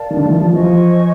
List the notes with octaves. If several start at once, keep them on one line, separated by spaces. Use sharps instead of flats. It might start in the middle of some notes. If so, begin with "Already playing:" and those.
Already playing: A#4 D5 F5 A5
D#3
D3
D#3
E3
F3
E3 C5 D#5 G#5 C#6
F3